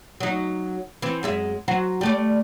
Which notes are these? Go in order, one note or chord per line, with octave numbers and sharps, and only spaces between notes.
F#3 D#4
E3 C4
F#2 G#3 E5
F#3 F#4 C5
G3 A3 D5